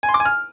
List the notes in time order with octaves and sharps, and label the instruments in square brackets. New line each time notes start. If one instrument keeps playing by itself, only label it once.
[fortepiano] G#5
C6
D6
G#5
F6